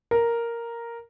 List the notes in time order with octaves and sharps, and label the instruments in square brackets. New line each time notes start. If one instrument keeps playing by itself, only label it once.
[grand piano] A#4